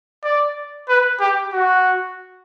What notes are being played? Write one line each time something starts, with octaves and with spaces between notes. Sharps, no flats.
D5
B4
G4
F#4